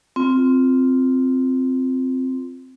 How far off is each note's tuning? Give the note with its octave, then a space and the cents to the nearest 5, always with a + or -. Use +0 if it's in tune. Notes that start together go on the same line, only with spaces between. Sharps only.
C4 -5 F4 +0